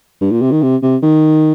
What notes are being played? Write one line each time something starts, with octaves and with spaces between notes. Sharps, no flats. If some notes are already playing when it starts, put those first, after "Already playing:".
G2
A#2
C3
D#3
C3
C3
D#3